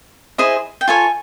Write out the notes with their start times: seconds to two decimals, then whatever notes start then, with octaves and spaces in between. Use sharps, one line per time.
0.38 E4 G#4 C5 D#5
0.81 G5
0.88 F4 A4 C#5 G#5